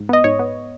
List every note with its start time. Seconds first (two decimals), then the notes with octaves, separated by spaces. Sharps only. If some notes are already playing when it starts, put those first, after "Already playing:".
Already playing: G#2
0.09 B3 D#5
0.24 G#2 C#5
0.39 B3